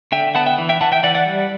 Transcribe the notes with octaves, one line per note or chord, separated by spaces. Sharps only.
D3 E5 G5
B3 F#5 A5
E5 G5
E3
E5 G5
E3 F#5 A5
E5 G5
E3 D5 F#5
D5 F#5
G3